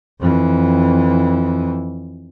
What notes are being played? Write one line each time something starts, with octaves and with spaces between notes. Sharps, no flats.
F2 E3